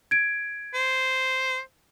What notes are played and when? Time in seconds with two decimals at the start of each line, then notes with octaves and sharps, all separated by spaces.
0.11 G#6 D7
0.74 C5